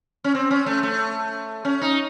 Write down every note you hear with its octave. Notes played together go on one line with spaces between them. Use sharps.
C#4
C4
C#4
A3
A3
C#4
D#4